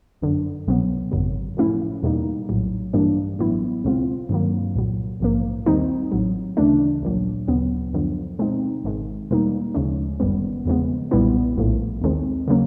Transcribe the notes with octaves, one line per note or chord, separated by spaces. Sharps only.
G1 F#2 D3
C2 B2 F#3 B3
G#1 F#2 C#3 F#3
A2 F3 A3 C#4 E4
E2 B2 G3 A#3 D#4
A#1 A2 F#3
G2 E3 G3 A#3 D4
A1 A2 F#3 B3 E4
C#2 B2 G#3 C4 F4
G2 D#3 F#3 A#3
C2 A#2 F#3
A#1 G#2 F3 A#3
D#2 D#3 G3 C4 D#4
A1 A2 F#3
D2 C#3 E3 A3 D4
A#1 A#2 F#3
D2 C#3 F#3 B3
F#2 D3 F3
B2 G#3 C4 D#4
G#1 G#2 D#3 G#3
E2 B2 G3 A#3 D#4
D2 C#3 F3 G#3 C#4
G1 F#2 D#3 G3 B3
E2 C#3 F3 G#3 B3
B1 A#2 G3 B3 E4
A#1 A2 F3 A3
D#2 D#3 G#3 C4
C#3 F#3 A#3 C#4